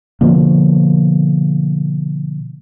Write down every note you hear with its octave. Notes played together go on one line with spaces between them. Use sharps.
B2 D3 F3 A#3